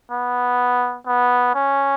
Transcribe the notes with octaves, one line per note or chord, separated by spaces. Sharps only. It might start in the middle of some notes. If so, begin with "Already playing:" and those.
B3
B3
C#4